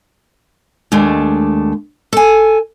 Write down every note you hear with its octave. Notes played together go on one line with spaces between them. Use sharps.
D#2 G#3 A3 D4
A4 G#5